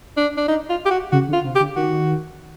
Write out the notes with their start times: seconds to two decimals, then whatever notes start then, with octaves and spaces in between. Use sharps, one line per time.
0.17 D4
0.37 D4
0.48 D#4
0.69 F4
0.86 G4
0.91 F#4
1.12 C#3 F#4
1.29 D3
1.33 F4
1.44 C3
1.55 G4
1.60 D3
1.76 D#3 F#4